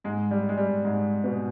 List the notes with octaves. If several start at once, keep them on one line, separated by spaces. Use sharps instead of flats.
G#2 G#3
G3
G#3
G3
G#2 G#3
B2 B3